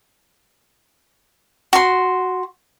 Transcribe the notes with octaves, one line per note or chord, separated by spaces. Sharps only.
F#4 C6